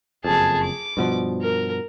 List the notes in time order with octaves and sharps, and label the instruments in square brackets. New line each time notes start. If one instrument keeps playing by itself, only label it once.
[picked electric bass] F#1 F2 [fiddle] G#4 A5
[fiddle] D6
[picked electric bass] G2 B2 F3
[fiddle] A#4